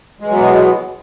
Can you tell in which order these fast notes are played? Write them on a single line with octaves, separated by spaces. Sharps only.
G#3 E3 F#3 B3 B2